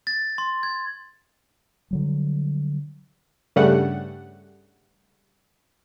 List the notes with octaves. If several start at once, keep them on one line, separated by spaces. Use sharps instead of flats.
A6
C6
G#6
D3 F#3 G3
G2 C#3 G3 A3 F#5